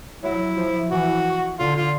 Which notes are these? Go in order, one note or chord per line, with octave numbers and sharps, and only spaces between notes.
F#3 E4
F3
E3 F#4
D3 F4
F4